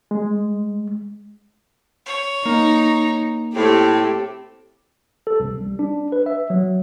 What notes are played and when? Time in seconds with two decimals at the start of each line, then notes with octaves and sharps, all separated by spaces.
0.11 G#3
2.06 C#5
2.46 A#3 D#4
3.55 A2 C4 G4 A4
5.27 A4
5.40 C2
5.61 G3
5.79 D4
6.12 B4
6.26 E5
6.50 F#3